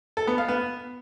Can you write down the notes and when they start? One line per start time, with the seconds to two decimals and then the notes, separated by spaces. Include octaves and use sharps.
0.17 A4
0.27 B3
0.38 F5
0.48 B3